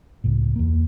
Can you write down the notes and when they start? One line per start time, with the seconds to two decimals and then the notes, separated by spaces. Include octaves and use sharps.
0.24 C#2 A2
0.56 E2 A#3